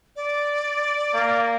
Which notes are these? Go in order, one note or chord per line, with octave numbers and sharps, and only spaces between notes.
D5
A#3